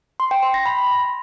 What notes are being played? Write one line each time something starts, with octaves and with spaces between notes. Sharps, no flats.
C6
G5
C6
A#6
B5